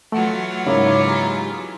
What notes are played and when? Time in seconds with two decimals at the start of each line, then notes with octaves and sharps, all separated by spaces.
0.12 E3 F#3 A3 F4 F#5
0.66 G#2 C#3 A#3 E4 C#5 E5 D6
1.06 G4 G#4 A#5